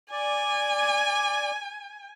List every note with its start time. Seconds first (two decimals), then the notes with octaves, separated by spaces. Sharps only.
0.11 D5 G#5